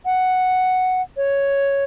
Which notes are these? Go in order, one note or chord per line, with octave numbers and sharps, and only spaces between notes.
F#5
C#5